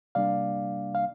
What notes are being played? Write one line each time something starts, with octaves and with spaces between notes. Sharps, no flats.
C3 G3 A#3 D4 D5 F5
F5